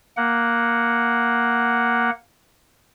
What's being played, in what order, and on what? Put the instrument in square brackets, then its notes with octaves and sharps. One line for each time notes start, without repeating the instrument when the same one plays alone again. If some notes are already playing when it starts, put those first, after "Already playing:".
[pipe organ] A#3 F#5